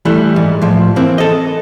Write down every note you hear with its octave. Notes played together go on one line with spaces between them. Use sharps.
E3 G3 A3
G#2
A2 F3
E3 A#3 C4
A4 D#5